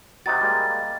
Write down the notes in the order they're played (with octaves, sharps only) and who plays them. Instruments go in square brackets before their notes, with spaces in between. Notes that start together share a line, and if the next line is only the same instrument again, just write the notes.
[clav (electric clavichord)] C3 D#4 F#4 [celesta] A6
[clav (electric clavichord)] G3 G#3 A#3